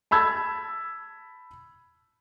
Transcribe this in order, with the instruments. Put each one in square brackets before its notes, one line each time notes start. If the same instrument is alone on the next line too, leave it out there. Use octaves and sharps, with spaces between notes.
[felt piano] A5 B5 E6 G#6